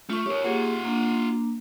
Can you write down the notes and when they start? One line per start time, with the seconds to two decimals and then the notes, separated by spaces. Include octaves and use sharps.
0.10 A3 F4 C#6
0.26 G4 A#4 C#5
0.44 A#3 F4 G4 G#4 F#5
0.85 A#3 D4